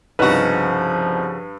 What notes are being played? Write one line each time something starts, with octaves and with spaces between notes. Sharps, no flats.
C2 G2 C#3 F3 D#4 F#4 B4 F#6